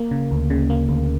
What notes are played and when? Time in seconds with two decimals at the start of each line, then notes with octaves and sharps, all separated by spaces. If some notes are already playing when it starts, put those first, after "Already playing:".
Already playing: A#3
0.11 C#3
0.31 D2
0.50 C#3
0.70 A#3
0.89 D2